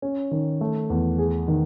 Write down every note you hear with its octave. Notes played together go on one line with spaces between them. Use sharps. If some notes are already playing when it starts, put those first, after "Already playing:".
C#4
D#3
A3
E2
G#4
D#3